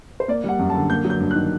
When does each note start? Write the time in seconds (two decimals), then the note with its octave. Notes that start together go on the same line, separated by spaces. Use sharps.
0.20 C5
0.28 A#3 D5
0.44 G3 F#5
0.59 F#2
0.70 A5
0.75 D3
0.90 A#3 G6
1.04 F#3
1.10 G6
1.20 G2
1.31 F#6
1.35 D#3